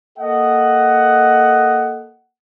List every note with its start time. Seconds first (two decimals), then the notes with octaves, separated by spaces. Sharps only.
0.18 A#3 A4 D#5 F#5